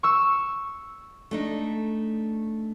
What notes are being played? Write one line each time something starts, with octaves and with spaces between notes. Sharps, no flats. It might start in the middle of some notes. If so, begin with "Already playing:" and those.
C#6 E6
A3 D4 D#4